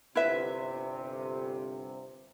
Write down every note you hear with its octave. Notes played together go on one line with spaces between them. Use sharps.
G1 C3 E4 B4 E5